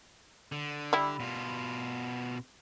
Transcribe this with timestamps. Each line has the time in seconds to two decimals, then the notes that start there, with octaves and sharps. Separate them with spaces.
0.52 D3
0.93 G3 E4
1.20 B2 F4